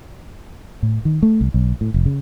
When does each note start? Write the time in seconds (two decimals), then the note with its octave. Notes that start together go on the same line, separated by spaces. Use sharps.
0.83 A2
1.05 D#3
1.22 A3
1.41 C2
1.54 B1
1.81 A2
1.94 F1
2.06 C#3